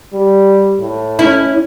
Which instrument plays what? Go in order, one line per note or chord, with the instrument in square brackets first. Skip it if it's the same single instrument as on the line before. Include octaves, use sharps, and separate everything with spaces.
[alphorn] G3
A2
[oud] C#4 E4